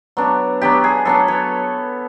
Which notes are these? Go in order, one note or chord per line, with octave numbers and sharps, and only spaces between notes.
F#3 B3 D4
F#3 B3 D4 G4
G#4
F#3 B3 D4 A4
C#5